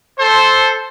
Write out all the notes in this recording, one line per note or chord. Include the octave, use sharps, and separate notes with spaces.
A4 C5